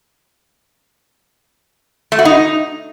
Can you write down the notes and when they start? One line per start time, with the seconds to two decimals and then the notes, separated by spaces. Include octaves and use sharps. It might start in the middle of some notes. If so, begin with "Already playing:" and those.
2.12 A3
2.19 F#4
2.25 D#4